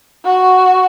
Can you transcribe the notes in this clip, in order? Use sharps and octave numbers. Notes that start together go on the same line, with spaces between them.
F#4